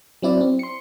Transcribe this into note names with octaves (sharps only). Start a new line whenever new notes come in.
F#3 C4 E4 D5
C4
C6 C#7